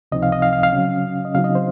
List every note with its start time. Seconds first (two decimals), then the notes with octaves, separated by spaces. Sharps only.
0.12 C#2 C3 F3 C4 D#4 D#5
0.23 F5
0.32 D#5
0.42 F5
0.53 F5
0.63 F5
0.73 C#3 F#3 C#4
1.25 D#5
1.35 C#3 F#3 C4 D#4 F5
1.44 D#5
1.55 C5